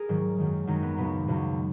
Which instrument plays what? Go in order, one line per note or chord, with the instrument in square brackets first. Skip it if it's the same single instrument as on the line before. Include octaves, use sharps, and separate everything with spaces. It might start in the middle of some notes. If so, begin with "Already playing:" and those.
Already playing: [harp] G#4 A#4
G#2 D#3 F#3
F#2 D#3 G#3
F#2 D#3 G#3 D#4
B3
C#2 B2 F#3 B3
C#2 B2 F#3